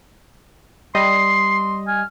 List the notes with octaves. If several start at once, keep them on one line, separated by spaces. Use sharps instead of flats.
G3 D#5 C6 C7
G#5 F6